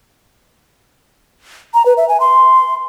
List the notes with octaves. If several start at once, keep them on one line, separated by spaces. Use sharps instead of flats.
A#5
B4
E5
G#5
C6